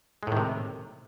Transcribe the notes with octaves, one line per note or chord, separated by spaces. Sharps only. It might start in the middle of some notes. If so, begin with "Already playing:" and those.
A2 C3 D#3 G#3